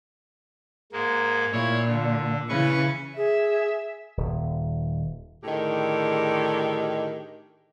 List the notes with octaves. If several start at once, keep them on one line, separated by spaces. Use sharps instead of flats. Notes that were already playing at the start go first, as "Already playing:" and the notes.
G#2 G#3 A#3
A#2 E4 C#5
D3
C#3 E3 C#4 B4 C#6
G#4 E5
D#1
A2 D3 D#3 G4 G#4